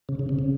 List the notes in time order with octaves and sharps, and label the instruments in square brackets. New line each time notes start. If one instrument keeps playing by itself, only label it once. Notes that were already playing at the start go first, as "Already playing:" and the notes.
[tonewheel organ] C#3
C#3
C3
C#3